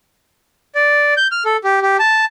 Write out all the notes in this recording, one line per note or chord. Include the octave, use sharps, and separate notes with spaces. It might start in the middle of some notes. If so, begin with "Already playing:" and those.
D5
G6
F6
A4
G4
G4
A5